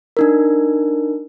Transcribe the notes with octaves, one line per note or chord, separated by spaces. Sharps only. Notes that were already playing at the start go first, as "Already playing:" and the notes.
D4 D#4 A#4